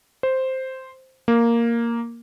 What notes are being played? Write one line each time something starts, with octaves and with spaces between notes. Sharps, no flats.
C5
A#3